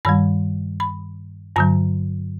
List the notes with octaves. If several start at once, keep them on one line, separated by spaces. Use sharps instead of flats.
G2 D#3 G3 B5
B5
G2 D3 F#3 A#5